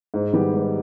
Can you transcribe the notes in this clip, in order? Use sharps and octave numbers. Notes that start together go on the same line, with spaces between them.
G#2
D#3 G3 B3 G4
G#2